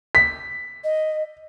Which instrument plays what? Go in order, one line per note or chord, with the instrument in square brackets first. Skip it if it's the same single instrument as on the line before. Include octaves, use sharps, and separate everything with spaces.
[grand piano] B6
[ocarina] D#5